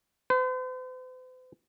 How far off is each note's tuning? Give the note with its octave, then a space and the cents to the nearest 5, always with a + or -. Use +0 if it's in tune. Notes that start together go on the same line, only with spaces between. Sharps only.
C5 -45